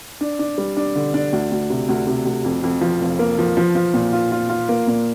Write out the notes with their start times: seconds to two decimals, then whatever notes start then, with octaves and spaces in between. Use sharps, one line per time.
0.21 D4
0.39 D4
0.58 G3
0.77 D4
0.96 D3
1.14 D4
1.33 D2
1.52 D2
1.70 C3
1.89 D2
2.07 C3
2.25 D2
2.44 F2
2.63 F2
2.81 F3
3.00 F1
3.19 A#3
3.38 F3
3.57 F3
3.75 F3
3.94 A#2
4.13 F4
4.32 F4
4.49 F4
4.69 A#3
4.87 A#2